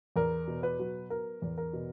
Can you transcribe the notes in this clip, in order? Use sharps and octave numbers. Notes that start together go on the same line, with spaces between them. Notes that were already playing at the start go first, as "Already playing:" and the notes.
E2 A#4
B2
B4
F#3
B3 A#4
E2
A#4
B2